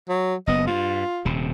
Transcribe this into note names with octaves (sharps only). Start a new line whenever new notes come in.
F#3
F#1 B3 D#5
G2 F4
D#1 C3